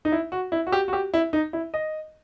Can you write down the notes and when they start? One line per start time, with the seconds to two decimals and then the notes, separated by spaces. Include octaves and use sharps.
0.05 D#4
0.12 E4
0.32 F#4
0.52 E4
0.67 F#4
0.72 G4
0.88 F#4
0.93 G4
1.14 E4
1.33 D#4
1.53 E4
1.74 D#5